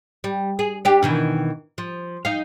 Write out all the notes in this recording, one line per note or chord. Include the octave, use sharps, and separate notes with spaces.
G3
G#4
D4 G4
B2 D#3 E3
F3
D#4 F5